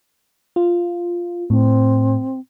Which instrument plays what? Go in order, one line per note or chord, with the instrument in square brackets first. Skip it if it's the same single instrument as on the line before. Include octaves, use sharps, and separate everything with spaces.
[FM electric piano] F4
[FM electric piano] A2 [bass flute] C4